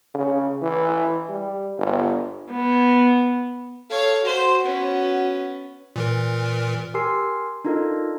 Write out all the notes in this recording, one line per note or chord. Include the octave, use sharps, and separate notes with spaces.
C#3
E3
G3
G1
B3
A4 C#5 F5
F#4 C5
B3 C#4
A#2 E3 A#4
G4 A#4 G#5 C6 E6 C7
D4 D#4 F4 A4 A#4 D#5